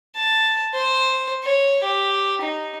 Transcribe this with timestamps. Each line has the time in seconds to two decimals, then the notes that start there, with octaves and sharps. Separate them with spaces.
0.16 A5
0.74 C5
1.44 C#5
1.83 G4
2.41 D#4